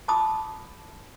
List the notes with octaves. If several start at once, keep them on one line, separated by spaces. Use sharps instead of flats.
A5 B5 D6 D#6